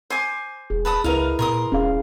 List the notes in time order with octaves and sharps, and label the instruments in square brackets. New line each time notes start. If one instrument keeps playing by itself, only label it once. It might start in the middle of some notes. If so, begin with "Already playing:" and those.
[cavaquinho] C5 G#5 D6
[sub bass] E1 [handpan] G#4
[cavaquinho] B4 A5 D#6
[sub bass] C#2 [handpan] E4 B4 [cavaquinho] A#4 D#5 F5
[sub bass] A#2 [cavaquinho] A#4 C6 D#6
[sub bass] E1 [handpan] C#4 G#4 F5